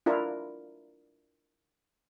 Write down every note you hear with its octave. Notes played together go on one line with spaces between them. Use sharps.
D4 E4 F4 A#4